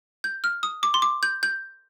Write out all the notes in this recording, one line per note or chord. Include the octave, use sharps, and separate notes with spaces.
G6
F6
D#6
D6
C6
D6
G6
G6